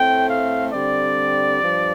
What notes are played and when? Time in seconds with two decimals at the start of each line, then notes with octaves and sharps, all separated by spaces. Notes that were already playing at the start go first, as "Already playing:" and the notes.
Already playing: A2 A3 C4 G5
0.30 F5
0.73 D3 G3 C4 D5
1.62 G2 F3